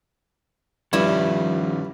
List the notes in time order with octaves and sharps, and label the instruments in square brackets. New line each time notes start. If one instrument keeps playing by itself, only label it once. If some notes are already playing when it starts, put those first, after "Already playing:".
[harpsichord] G2 [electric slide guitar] D#3 C#4 [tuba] F3 [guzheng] E4